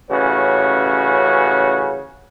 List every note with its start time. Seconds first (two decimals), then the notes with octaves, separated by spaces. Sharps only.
0.10 A1 C#3 C#4 F#4 B4